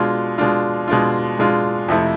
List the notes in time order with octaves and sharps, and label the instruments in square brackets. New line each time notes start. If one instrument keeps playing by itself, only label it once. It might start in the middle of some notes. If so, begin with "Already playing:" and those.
Already playing: [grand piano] B2 G#3 D4 F4
B2 G#3 D4 F4
B2 G#3 D4 F4
B2 G#3 D4 F4
F2 C3 F3 A3 E4